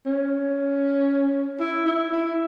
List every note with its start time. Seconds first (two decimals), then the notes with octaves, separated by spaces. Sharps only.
0.06 C#4
1.60 E4
1.86 E4
2.12 E4